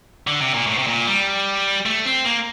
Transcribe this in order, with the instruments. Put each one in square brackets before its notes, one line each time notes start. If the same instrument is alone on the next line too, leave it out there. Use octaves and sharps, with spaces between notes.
[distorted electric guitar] D3
C3
A#2
A2
C3
A#2
G3
A3
C4
A#3